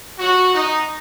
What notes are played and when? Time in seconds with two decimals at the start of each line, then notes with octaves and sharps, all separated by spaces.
0.19 F#4
0.55 D#4